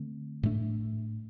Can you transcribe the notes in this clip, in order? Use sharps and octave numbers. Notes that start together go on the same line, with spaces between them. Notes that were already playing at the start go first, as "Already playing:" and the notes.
Already playing: D3 A3 C4
A2 A3 D4